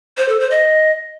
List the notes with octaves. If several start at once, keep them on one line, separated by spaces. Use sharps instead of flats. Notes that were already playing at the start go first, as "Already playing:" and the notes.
C5
A4
C5
D#5